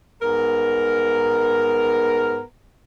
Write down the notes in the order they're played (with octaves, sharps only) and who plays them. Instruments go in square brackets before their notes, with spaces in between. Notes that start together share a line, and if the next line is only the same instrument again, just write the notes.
[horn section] G#2 B3 A#4